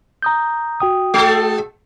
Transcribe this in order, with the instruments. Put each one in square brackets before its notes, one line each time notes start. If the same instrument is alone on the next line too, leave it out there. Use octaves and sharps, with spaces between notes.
[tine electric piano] A#5 D#6 G6
F#4 G5 D#6
[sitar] G#3 A4